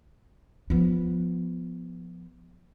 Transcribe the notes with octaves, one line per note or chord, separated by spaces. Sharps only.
F3 B3